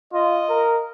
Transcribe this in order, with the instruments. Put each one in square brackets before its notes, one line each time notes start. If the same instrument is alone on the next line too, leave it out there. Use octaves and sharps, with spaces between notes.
[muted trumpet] F4 [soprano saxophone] D#5
[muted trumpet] A#4